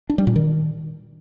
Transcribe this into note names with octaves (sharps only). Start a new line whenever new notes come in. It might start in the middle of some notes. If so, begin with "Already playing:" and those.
D4
G3
A#2
D#3